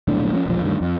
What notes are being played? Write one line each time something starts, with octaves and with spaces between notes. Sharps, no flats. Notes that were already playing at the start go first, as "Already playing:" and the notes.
D#1 B1 A2 D4
F3 A3 C#4
E1 A#1 F3
D2 G2 D#3
F2